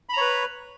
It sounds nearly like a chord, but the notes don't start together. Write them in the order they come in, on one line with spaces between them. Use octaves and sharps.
B5 A#5 C#5 B4